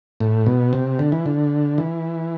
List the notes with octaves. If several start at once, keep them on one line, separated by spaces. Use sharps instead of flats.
A2
B2
C3
D3
E3
D3
E3